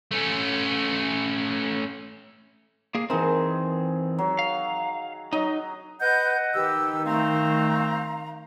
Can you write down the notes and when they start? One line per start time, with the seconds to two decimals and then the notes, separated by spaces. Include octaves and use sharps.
0.11 A3 C#4
2.95 A#3 G#4
3.10 D#3 E3 C4 G#4
4.18 F#3
4.39 F5
5.33 F#3 D#4 D#5
6.01 B4 D#5 F#5 G6
6.55 D#3 G4 B4 E6
7.05 A3 C4 F5 A#5